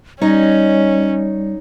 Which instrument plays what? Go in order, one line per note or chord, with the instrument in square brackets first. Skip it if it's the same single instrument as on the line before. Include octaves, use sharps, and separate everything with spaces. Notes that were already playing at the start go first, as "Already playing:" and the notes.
[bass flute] G3 [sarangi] C#4 [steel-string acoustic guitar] D#4 C#5 D#5